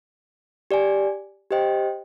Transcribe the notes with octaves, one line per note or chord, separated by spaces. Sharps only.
G4 D5 G#5
G4 C5 D#5 G5